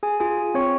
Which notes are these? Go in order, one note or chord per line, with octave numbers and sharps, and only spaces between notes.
G#4 G#5
F4 G#4 G#5
F4
C4 C#5 C#6